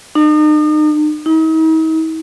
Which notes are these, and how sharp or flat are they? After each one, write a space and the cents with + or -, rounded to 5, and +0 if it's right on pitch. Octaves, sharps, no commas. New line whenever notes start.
D#4 -40
D#4 +45